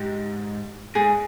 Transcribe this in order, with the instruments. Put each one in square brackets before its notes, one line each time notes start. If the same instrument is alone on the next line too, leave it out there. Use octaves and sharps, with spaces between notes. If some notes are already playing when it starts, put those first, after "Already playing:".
Already playing: [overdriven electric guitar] G#2 [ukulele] G4
[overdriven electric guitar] G#2 [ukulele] G#4